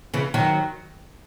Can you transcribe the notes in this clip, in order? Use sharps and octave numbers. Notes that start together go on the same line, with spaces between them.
C#3 E3
D#3 F#3